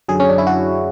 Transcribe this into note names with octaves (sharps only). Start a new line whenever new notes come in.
F#2 D3 F#3 G#4
C#4
D4
E4
F#4